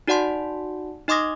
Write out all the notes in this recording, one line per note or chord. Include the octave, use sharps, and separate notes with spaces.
D#4 F#4 D5 F#5 A5 C6
D#4 D#5 C6 D6 D#6 A#6